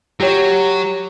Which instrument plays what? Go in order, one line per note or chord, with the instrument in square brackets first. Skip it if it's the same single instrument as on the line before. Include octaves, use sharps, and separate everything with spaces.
[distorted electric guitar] F#3 [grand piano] G4 C#5